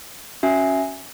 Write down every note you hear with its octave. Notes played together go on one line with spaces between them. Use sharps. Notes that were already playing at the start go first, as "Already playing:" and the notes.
C#4 F#4 E5 G#5